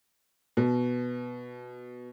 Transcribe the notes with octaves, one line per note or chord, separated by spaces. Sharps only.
B2